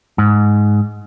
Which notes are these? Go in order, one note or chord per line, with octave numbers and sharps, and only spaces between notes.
G#2